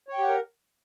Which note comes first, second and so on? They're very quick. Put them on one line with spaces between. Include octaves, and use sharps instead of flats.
C#5 G5 G4 F#5 A#4